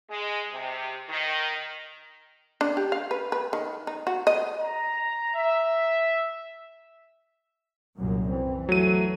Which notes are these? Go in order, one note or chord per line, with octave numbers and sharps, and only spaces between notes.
G#3
C3
D#3
D4
G4
F5
B4
B4
D#3
D#4
F#4
D#5
A#5
E5
C2 F#2 A#2
E3 C4
F#3 A3 D#7